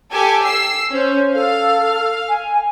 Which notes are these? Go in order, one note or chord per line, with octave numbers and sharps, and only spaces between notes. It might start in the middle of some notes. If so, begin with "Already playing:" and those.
G4 A4 G#5
E6 C7
C#4 C5
A4 F5
G#5